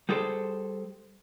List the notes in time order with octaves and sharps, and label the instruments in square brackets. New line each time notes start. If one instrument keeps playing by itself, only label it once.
[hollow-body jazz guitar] G3 G#4 A4 C5